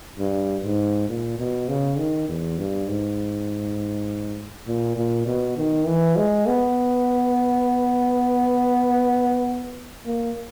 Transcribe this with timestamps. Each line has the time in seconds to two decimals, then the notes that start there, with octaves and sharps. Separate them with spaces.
0.18 G2
0.64 G#2
1.09 A#2
1.38 B2
1.68 C#3
1.98 D#3
2.29 E2
2.58 G2
2.88 G#2
4.67 A#2
4.97 A#2
5.26 B2
5.57 D#3
5.86 E3
6.16 G#3
6.47 B3
10.06 A#3